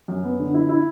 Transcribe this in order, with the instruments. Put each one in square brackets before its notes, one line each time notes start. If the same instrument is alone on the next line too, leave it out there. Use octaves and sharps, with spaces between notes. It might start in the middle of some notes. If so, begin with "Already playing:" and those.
[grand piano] F#2
B3
D3
E4
E4